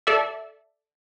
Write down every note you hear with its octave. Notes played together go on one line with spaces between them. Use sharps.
A4 D5 E5